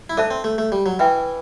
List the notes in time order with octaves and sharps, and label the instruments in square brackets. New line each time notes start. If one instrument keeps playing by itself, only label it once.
[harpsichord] E4
[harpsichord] D4 [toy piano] A4 C5 E5 A5
[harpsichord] C4
A3
A3
G3
F#3
[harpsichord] E3 [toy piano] B4 E5 G5